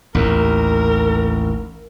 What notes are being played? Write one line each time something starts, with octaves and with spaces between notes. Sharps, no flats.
A1 D#2 A#4